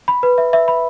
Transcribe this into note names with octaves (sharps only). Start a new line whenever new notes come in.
B5
B4
E5
E5
B5